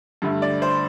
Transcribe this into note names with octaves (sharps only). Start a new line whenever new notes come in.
G2 D3 A3
D5
C5